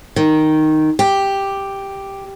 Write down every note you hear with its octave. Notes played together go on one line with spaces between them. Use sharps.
D#3
G4